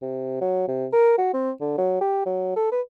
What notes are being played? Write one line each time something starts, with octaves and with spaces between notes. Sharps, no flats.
C3
F#3
C3
A#4
F#4
C4
D3
F#3
G4
F#3
A4
B4